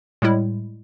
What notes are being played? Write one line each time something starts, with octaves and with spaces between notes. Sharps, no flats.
A2 G3 G#3 E4